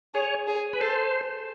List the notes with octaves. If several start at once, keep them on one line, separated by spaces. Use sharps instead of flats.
G#4 C#5
G#4
B4
A4 C5